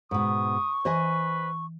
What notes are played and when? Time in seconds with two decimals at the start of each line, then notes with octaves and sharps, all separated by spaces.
0.11 G#2 B2 C#6 D#6
0.85 E3 B4 C5 D#5 G#5